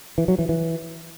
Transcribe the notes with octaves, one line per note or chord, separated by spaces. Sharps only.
E3
F#3
E3
E3